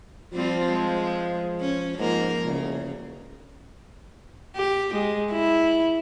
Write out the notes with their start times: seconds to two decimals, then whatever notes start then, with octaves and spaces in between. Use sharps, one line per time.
0.33 F3 G3 C4 F4
0.69 G#3
1.61 C#4
1.99 G#2 F3 A#3 A#4
2.46 E1 C#3
4.56 G4
4.94 G#3
5.32 E4